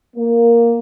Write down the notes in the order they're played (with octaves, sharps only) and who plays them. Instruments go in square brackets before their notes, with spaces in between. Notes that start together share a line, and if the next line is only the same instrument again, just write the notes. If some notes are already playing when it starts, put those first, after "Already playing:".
[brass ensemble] A#3